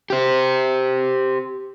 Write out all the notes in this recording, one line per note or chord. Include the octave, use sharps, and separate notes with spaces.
G4 C5